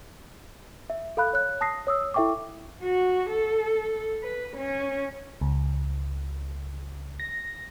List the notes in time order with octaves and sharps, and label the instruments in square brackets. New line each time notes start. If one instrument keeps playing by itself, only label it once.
[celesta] E5
A4 F5 B5 F#6
C#5 F#6
A5 D#6 A#6 C7
C#5 D#6 E6
E4 A4 E5 G5 C#6 D6
[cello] F#4
A4
B4
C#4
[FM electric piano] C#2
A#6